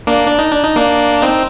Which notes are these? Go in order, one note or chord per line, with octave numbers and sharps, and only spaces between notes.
A#3 D4
D4
D#4
D4
D#4
A#3 D4
C4 D#4